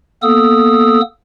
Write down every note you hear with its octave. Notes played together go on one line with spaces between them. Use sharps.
A#3 B3 A4 D#6 E6